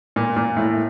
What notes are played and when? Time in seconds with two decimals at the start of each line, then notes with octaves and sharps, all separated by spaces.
0.16 A#2
0.36 A#2
0.57 A2